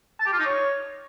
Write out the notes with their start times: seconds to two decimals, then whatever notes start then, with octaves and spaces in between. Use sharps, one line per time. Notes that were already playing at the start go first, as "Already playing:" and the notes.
0.20 A5
0.26 G4
0.33 F4
0.39 D#4
0.46 C#5